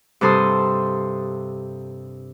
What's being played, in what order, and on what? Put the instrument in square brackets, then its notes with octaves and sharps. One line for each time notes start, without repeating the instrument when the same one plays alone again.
[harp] G2 C3 A4 C6 D#6